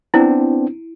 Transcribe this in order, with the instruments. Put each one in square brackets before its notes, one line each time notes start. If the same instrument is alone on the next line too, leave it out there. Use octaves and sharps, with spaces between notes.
[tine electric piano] B3 C4 D4 [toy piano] E4